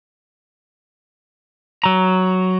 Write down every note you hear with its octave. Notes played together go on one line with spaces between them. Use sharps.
F#3 A#5